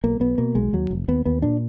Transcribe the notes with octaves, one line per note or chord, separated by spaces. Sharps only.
B1 A#3
B1 B3
B2 A#3
B1 G#3
D#2 F#3
F1
D#2 B3
D#2 B3
A#2 D4